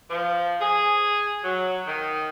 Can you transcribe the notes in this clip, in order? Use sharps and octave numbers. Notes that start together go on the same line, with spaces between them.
F3
G#4
F#3
D#3